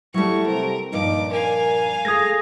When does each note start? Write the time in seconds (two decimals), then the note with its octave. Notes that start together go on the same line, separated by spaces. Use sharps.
0.14 F#3 G3 A3 E4 C#6
0.46 C3 A#4
0.92 G2 A#2 F3 D#4 D6
1.32 A#4 F5 G#5
2.05 A3 F4 G#4 D#6 G#6 A#6